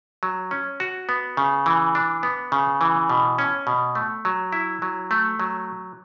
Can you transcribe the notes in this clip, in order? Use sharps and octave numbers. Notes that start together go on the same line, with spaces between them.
F#3
C#4
F#4
B3
C#3
E3
D4
B3
C#3
E3
B2
C#4
B2
A3
F#3
E4
F#3
A3
F#3